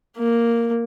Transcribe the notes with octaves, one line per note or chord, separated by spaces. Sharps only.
A#3